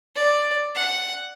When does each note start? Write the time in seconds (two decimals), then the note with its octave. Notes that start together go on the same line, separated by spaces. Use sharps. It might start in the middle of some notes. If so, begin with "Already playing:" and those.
0.16 D5
0.75 F#5